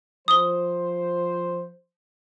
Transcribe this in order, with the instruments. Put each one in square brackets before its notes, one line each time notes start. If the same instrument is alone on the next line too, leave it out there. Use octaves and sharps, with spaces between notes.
[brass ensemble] F3 C5 [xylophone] D#6 G7